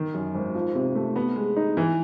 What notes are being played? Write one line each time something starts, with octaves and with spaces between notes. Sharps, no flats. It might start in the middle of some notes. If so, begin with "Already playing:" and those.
Already playing: D#3
F#2
G#1
F3
C3
A3
B3
G#3
D#4
E3